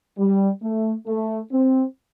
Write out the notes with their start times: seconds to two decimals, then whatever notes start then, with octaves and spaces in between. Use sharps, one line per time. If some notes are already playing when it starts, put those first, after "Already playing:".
0.18 G3
0.62 A3
1.07 A3
1.52 C4